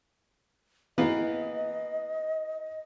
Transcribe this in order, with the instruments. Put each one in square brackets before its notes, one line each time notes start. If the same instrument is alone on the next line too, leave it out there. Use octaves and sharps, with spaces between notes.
[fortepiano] E3 A#3 B3 [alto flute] D#5